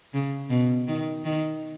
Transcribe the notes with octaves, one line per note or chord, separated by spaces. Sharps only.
C#3
B2
D#3
D#3